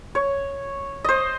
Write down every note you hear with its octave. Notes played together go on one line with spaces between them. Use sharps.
C#5
C5 D#5